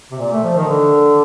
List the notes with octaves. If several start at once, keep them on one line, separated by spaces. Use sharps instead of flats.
C3
A#2
A3
F3
D#3
D3